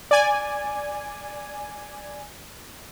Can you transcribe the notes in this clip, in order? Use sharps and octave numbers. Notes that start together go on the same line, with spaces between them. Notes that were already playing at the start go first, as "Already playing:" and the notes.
D5 G#5